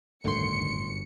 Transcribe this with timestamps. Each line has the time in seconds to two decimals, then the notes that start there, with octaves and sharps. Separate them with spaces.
0.24 G1 C#2 F#2 A2 D3 D#3 C6 C#7